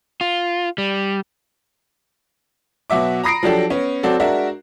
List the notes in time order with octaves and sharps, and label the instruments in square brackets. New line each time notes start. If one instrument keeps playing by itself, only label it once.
[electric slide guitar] F4
G3
[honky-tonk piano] B2 F#3 F#4 E5 D6
A#5 B5 D#6 A#6 C7 D7
F3 F#3 D4 G4 A4
B3 C#4
F#3 C4 F#4 A4 D5
G#3 D4 F#4 A#4 E5